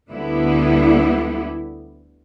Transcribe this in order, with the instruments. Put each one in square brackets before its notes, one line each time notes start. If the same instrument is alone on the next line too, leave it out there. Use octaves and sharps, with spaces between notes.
[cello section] D2 D3 G3 B3 E4